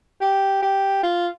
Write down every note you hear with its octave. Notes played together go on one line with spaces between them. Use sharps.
G4
G4
F4